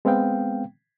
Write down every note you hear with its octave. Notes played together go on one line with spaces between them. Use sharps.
G#3 B3 C4 F5 G5